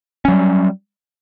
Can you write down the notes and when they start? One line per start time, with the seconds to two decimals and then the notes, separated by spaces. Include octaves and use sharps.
0.25 C#4
0.28 F#3
0.32 G3